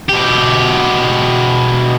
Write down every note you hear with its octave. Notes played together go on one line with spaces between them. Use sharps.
B2 G4